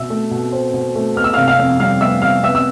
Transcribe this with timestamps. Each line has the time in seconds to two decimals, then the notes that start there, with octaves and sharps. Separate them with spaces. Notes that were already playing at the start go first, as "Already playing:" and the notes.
Already playing: B2 E5 E6
0.10 A3
0.31 B2
0.52 C4
0.74 B2
0.95 A3
1.16 B3 F6
1.24 E6
1.34 F5 F6
1.38 C3
1.48 F5 F6
1.59 F2
1.80 G3 F5 F6
2.01 B3 E5 E6
2.22 C3 F5 F6
2.43 B3 E5 E6
2.55 E6